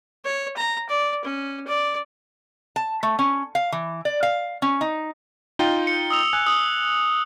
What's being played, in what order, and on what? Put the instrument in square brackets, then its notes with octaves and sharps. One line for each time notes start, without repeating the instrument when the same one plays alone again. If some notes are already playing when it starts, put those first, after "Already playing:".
[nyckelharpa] C#5
A#5
D5
C#4
D5
[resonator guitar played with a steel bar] A5
A3
C#4
F5
E3
D5
F5
C#4
D#4
[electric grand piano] D#4 F4 G5 [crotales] G7
[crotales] C#7
D#6 E6 F7
[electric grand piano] G#5 [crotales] F#6
[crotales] D#6